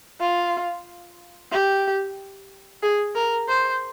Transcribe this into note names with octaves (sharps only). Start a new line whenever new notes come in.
F4
G4
G#4
A#4
C5